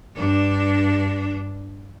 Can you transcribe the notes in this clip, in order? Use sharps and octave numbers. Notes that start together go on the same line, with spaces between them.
G2 D4